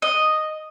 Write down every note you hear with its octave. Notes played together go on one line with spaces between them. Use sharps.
D#5